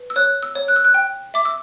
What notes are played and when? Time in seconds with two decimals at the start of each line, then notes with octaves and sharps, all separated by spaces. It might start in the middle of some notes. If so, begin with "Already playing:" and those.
Already playing: B4
0.10 E6
0.16 C#5 F#6
0.43 E6
0.55 C#5
0.68 F#6
0.76 E6
0.84 F#6
0.94 G5
1.34 E5 D6
1.45 E6